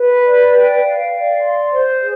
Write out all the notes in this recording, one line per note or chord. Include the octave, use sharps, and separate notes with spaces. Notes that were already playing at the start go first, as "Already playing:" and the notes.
Already playing: B4
D5
G5
F5
D5
C6
C5
G#4